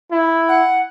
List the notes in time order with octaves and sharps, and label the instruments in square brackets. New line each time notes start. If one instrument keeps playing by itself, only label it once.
[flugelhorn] E4
[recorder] F#5